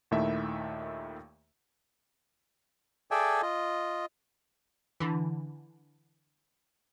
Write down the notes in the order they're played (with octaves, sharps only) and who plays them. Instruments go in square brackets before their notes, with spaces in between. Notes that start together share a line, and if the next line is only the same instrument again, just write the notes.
[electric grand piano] D#2 A#2 D#3 A3 E4 E5
[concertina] G#4 A4 D5 E5 G5 G#5
F4 D#5
[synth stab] D3 E3